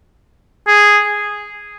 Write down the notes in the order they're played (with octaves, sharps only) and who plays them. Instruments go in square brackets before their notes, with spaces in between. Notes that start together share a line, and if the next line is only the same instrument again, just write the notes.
[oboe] G#4